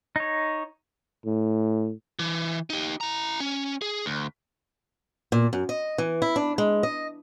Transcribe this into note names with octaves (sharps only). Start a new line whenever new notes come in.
D#4 C#5
A2
E3
D#4 G4
E4 A#5
C#4
G#4
D2
A#2
F#2
D#5
E3
E4
D4
G#3
D#5